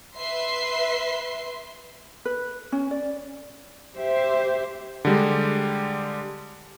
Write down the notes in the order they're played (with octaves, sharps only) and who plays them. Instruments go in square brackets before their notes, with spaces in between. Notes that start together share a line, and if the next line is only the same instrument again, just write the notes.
[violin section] B4 E5 C6 C7
[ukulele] B4
C#4
D5
[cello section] G4 C5 E5
[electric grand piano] D3 G3 G#3